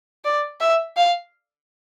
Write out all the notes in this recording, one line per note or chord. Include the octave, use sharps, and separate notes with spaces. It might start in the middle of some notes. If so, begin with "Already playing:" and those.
D5
E5
F5